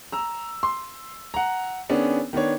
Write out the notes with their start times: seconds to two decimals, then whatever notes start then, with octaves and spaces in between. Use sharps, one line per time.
0.12 A#5 E6
0.63 C6
1.34 F#5 A#5
1.89 D#3 B3 C#4 D4 G#4
2.33 D#3 B3 D4 C#5